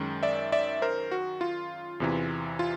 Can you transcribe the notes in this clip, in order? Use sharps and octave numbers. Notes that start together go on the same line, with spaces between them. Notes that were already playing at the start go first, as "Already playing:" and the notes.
Already playing: F#2 D#3 G#3 C#4
D5 E5
D5 E5
A#4 C5
F#4
F4
E2 C3 E3
F4